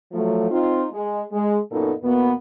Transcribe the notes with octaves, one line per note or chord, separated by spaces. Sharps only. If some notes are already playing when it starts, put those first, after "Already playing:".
F3 F#3 A3
C4 D#4 F4
G#3
G#3
F#2 A#2 A#3 B3 D#4 A4
E2 B2 A#3 B3